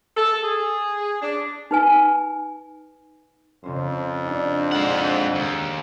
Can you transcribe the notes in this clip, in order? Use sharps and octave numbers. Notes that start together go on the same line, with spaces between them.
A4
G#4
D4
D#4 B4 G#5
F2 C#3 C#4 C5
D4 D#4 G4
G#3 D4 G#4 C5 F#5
D#2